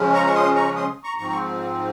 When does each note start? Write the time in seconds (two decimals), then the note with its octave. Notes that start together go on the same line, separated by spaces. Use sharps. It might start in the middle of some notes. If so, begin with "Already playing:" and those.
Already playing: C#3 F3 G#3 C#4
0.14 A#5 C#6
0.27 C#6
0.34 C6 D#6
0.55 A#5 C#6
0.76 C6 D#6
1.04 A#5 C#6
1.18 G#2 F3 C4 A#5 C#6
1.30 C#6